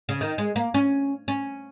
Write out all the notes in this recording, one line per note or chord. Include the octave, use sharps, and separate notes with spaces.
C#3
D#3
G#3
A#3
C#4
C#4